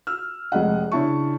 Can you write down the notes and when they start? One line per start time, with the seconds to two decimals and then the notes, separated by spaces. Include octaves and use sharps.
0.07 E6 F6
0.52 F1 G#3 D#5 F#5
0.92 C#3 D4 E4 A5 C#6